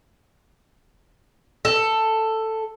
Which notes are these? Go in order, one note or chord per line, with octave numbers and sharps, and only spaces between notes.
A4